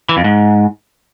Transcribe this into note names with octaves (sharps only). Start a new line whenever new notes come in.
E3
F2
G#2